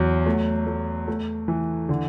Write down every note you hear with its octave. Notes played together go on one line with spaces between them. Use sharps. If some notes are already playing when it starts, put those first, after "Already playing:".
Already playing: E2 F#3
A3
A3
A3
E3
D3